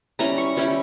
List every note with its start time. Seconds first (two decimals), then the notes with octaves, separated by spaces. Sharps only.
0.19 G3 C#4 E4 A#5
0.38 C#6
0.57 G3 C#4 E4